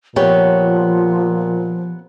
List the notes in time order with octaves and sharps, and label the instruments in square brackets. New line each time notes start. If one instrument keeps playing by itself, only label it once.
[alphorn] A#2 [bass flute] F3 [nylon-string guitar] B3 G4 C#5